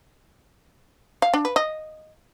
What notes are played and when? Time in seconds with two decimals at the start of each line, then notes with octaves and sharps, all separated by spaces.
1.22 F5
1.34 D4
1.45 B4
1.56 D#5